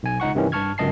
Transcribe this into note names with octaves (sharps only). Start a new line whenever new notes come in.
B1 G#5
C#2 D#4 F#5 C#6
G2 C3 D#3 E3 C#4
G2 A5 C#6 F6 G#6
G1 C#2 F#2 D#5 A5 C7